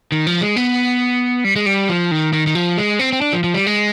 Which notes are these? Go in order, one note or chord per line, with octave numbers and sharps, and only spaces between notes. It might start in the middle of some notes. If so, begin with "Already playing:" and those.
D#3
F3
G#3
B3
G3
G#3
G3
F3
D#3
D#3
D#3
F3
G#3
C4
C4
D4
F3
F3
G3
G#3